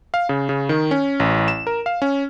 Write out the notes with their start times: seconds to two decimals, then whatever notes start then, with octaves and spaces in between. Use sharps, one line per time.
0.14 F5
0.29 C#3
0.49 C#3
0.69 D#3
0.91 C#4
1.20 A1
1.48 E7
1.67 A#4
1.86 F5
2.02 C#4